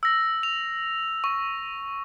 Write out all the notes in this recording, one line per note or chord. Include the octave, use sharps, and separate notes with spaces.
E6 A#6
F7
C#6